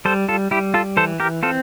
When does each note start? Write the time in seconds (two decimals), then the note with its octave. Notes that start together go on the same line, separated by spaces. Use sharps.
0.05 G3 A4 C5
0.28 F4 A4
0.51 G3 E4 G4
0.74 F4 A4
0.97 E3 A4 C5
1.20 G4 A#4
1.43 C4 F4 A4